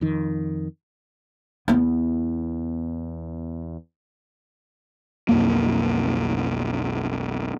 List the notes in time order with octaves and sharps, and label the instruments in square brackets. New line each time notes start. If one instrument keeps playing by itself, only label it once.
[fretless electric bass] F2 D#3
[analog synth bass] E2 [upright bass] B3 E4
[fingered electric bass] B1 F2 A#3